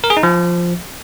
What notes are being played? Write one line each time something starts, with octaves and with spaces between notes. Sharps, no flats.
A#4
G#4
D#4
F3